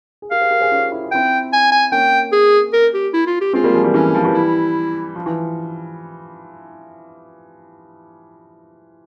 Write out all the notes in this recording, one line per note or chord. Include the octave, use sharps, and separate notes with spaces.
G#4
G4 A#4 F5
G#4 C5
G4 A#4
G#4 C5
C#4 F4
E4
F4
C4 E4 G5
G#5
G#5
A#3 C#4 G5
G#4
A#4
G4
E4
F4
G4
G#3 C4 F4
G3 A#3
F3 G#3
E3 G3
E3 G3 C#4
F3
E3 G3
E4
F3
E3